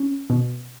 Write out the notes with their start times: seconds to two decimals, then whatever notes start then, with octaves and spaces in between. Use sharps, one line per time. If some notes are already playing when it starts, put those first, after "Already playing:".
Already playing: C#4
0.30 B2